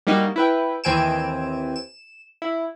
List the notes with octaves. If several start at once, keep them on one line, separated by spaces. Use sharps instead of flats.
G3 A#3 D#4 F#4
E4 B4 G5
D#2 E3 C4 G#5 D7 E7
E7
E4